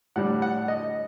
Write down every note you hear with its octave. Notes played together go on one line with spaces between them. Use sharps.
A2 G3 D4 F#5
F#5
D#5